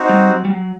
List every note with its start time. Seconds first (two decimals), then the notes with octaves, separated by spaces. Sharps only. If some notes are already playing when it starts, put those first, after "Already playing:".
Already playing: C4 D#4 F#4
0.09 G3
0.29 F#3
0.45 G3
0.50 F#3